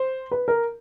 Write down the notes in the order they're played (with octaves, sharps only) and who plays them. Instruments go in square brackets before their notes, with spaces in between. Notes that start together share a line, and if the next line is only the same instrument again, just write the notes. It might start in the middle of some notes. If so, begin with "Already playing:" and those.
Already playing: [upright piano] C5
B4
A#4